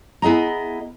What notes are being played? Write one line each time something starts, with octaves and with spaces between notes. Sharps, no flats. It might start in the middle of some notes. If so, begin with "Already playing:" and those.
B3 E4 G#4 D#5 A#5